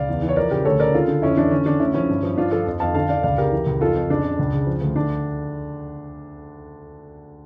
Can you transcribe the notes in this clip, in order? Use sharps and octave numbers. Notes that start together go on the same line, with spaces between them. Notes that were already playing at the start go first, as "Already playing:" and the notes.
Already playing: C#2 D5 F5
E2
E3
C#5
F3 A#4 D5
C#3 G4 A#4
D2 A4 C#5
C#3 A#4 D5
D3 F4 A4
D3
F2 C#4 E4
E3 D4
D3 C#4
D3 D4
D2 C#4 E4
F3 C#4 E4
G2
F3
G2 D4 F4
F3 F4 A4
F2
F2 F5 A5
D3 F5 A5
D3 D5 F5
C#2 D5 F5
C#3 G4 A#4
E3
C#2
F2 F4 A4
F2
C#3 D4
C#3
C#2
C#3
F3
D2
D3 D4